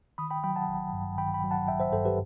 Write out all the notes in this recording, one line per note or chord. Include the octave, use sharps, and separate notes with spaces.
D#3 B5 D#6
G5 B5
F#3 G5 B5
F#5 A5
A1
G2
D#3 G5 B5
G5 B5
F#3
F#5 A5
A1 E5 G5
C5 E5
G2 A4 C5
G4 B4